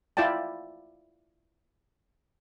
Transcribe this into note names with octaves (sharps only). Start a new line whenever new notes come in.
E4 F4 D5 G5 A5